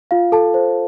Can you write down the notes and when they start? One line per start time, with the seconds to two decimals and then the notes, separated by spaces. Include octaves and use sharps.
0.11 F4 F5
0.32 A4 A5
0.54 C5